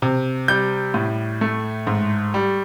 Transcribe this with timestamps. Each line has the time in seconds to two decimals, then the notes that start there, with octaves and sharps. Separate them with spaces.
0.02 C3
0.48 G3 G6
0.94 A2
1.41 A3
1.87 G#2
2.34 G3